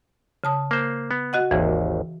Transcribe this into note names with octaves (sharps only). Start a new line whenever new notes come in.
C#3 A5 D#6
A#3 C5
B3
F#4 D#5 F#5
G#1 D#2 E3